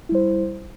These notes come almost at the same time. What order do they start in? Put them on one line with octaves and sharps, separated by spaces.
E4 G3 C5